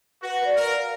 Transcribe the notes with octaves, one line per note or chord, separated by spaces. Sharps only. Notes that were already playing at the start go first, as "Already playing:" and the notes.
F#4 B4
D5
A#4
F5